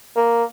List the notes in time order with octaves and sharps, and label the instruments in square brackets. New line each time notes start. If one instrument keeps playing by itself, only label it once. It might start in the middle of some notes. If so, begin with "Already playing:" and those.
[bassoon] A#3